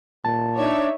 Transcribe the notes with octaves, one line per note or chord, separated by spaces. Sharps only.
A#2 A5
D4 D#4 C#5 D5 E5